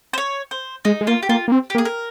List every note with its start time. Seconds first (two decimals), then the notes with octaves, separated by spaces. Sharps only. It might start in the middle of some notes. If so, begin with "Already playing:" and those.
0.13 C5
0.18 C#5
0.51 C5
0.85 G#3 D#4
1.01 G#3
1.07 A#3 F4
1.23 G4
1.29 A#3 F4
1.48 A#3
1.52 C4
1.70 G4
1.75 A#3
1.78 G#4
1.85 A#4